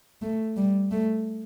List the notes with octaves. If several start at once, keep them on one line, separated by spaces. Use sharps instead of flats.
A3
G3
A3